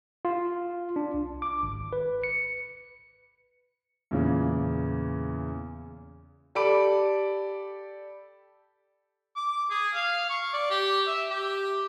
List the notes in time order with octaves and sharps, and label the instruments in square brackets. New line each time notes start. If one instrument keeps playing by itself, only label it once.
[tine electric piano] F4
D4
C2
D6
G#1
B4
C#7
[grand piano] E2 A#2 C#3
[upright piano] G4 A4 D5 B5 D6 D7
[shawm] D6
G#4
F5
C#6
D5
G4
E5
G4